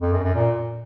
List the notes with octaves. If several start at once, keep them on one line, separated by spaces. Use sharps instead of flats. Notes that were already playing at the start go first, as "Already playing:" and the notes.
F2
F#2
F#2
A#2